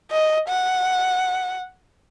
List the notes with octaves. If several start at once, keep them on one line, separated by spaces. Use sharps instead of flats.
D#5
F#5